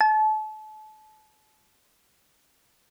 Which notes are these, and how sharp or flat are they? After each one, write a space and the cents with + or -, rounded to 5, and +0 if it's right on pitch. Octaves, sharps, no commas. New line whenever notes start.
A5 -35